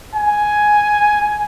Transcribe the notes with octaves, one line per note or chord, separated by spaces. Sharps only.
G#5